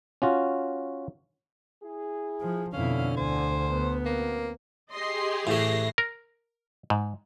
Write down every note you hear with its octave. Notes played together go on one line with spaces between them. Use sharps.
C#4 F4 F#4
E4 G#4
F3
F2 B2 D3 C#4 E4 F5
D2 C5 G#5
B3
F#2 B2 A#3 C4
G4 G#4 D#5 C6 C7
A2 E3 A3 A#6 C7
A#4
G#2